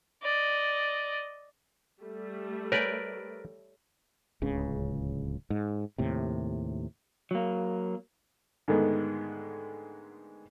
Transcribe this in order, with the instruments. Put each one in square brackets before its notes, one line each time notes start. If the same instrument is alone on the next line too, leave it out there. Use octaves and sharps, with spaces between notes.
[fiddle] D5 D#5
[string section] G3 A3
[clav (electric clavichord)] A#4 B4 D5 [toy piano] C#5
[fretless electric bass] D1 C#2 C#3
G#2
D#2 A2 C3
[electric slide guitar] F#3 A#3
[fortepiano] G#2 D3 D#3 G#3 A3 B3